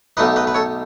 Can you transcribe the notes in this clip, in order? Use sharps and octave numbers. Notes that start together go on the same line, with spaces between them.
B1 B2 A3 D#4 B4 D#5
B4 D#5
B4
A4 C#5